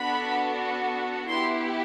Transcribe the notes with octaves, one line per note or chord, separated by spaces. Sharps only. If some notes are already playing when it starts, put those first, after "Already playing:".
Already playing: B3 D4 F#4 A4 B5
B3 E4 G4 C6